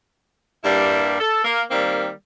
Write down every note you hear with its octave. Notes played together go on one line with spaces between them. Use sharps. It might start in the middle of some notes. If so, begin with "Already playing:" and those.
G2 G3 A#3 E4
A4
A#3
D#3 G3 A#3 C4